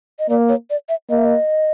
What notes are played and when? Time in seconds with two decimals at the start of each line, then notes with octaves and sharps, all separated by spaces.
0.19 D#5
0.29 A#3 D5
0.49 C#5
0.70 D5
0.89 E5
1.10 A#3 D#5
1.18 E5
1.25 D#5